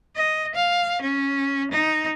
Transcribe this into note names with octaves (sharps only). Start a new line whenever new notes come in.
D#5
F5
C#4
D#4